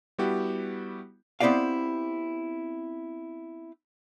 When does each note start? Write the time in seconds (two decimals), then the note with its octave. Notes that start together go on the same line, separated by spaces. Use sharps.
0.18 G3 B3 E4 F#4 G4
1.40 B3 C4 E4 G4 D5 F5